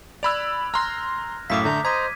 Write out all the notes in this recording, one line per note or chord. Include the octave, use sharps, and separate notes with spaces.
D5 B5 E6 F#6 G#6 F7
A#5 C6 F6 F#6 A#6
F#2 A2 E5 F5 D6 D#6 B6
D3 A3 A#5 G6
C5 D#5 A#5 G#6 B6 D#7